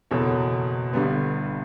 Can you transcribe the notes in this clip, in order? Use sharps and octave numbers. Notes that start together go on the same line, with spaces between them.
F#1 E2 B2 A4 C#5
G1 G2 D3 G3 B3